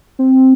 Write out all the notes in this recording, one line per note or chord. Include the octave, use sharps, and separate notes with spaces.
C4